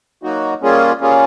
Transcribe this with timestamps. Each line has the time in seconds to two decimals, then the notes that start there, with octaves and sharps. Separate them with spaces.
0.23 F#3 A#3 D#4 F#4
0.62 G3 A#3 C#4 F4 G#4
1.00 G3 A#3 C#4 F4 G#4